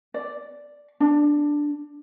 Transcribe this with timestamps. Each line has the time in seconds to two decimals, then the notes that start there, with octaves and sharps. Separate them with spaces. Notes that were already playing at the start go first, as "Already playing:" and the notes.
0.14 D5
1.00 D4